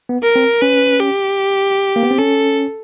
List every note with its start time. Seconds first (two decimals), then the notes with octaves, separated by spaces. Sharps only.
0.09 B3
0.23 A#4
0.36 C4
0.61 C#4 B4
1.00 G4
1.96 A#3
2.03 B3
2.11 C4
2.18 C#4 A4